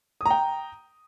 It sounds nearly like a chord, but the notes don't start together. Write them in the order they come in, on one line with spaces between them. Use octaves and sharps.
D#6 A#5 G5